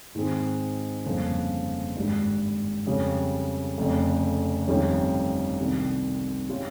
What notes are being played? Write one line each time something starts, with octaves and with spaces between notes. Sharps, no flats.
G#2 D#3 G#3 C4
G1 F2 C#3 F3 A#3
G#1 G2 G3
F2 C#3 G3 C#4
F1 F2 C#3
G1 F2 D#3 G3 C#4
C2 C3 D#3
G3 C#4 F4